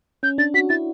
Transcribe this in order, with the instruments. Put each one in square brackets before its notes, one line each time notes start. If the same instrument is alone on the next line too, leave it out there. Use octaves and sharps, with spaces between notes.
[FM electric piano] C#4 [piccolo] G6
[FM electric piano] D4 [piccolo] A6
[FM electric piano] F#4 [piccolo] B6
[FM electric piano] E4 [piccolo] A6